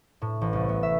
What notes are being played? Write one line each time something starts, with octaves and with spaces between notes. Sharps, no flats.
A2
A1
C2
B3
E5